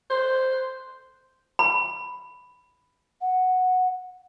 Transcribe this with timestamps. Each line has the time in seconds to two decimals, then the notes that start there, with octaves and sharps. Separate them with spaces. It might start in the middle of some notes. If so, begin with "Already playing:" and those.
0.10 C5
1.59 B5
3.21 F#5